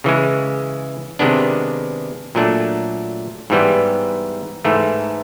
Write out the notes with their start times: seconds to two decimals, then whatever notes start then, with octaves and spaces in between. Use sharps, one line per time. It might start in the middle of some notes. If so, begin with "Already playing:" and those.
0.04 C#3 E3 G#3
1.19 C3 D#3 G#3 B3 D4
2.35 A#2 F#3 A3 D4
3.50 G#2 E3 G3 B3
4.65 G#2 E3 A3